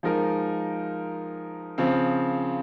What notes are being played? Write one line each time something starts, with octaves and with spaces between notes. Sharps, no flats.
F3 G#3 D#4 A#4
C#3 F3 C4